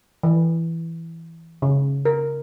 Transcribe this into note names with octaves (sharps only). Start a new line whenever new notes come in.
E3
C#3
A#4